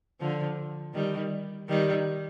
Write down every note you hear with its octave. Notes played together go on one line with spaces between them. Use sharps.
D3 F3
D#3 G3
D#3 G3